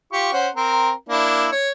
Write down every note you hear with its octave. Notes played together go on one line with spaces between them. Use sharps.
F4 G4 C#6
C#4 C5 F#5
C4 A#4
A#3 D4 E4
C#5